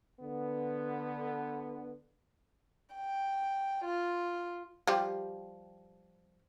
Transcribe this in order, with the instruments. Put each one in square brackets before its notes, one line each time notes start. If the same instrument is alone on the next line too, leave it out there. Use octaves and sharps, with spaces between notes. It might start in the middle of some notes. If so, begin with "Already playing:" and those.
[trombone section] D3 B3
[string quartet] G5
F4
[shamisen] F3 G3 G4